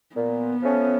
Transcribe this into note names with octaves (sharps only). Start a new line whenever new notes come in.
A#2 B3
F3 A3 C#4